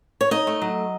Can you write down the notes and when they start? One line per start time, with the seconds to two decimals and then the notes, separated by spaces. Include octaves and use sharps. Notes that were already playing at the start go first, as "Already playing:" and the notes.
0.21 C#5
0.31 D#4 D#5
0.47 A3
0.62 F#3